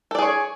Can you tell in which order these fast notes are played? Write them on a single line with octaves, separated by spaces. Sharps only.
A4 D5 G#4 C#5